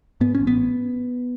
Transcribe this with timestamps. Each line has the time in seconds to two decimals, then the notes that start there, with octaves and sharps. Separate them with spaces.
0.21 G#2 B3
0.35 C#4
0.40 A1
0.47 B3